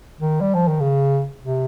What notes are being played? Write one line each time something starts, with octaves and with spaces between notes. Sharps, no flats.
D#3
G3
F3
D#3
C#3
C3